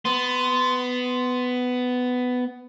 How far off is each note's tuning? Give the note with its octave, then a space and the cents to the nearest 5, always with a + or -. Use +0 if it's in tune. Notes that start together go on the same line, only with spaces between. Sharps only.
B3 +15 C6 -10